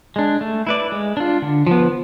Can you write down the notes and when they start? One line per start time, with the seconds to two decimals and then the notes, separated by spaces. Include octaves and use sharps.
0.16 G#3 D4
0.41 A3
0.67 E4 B4 D5
0.92 G#3
1.17 D4 F4
1.42 D3
1.67 F3 B3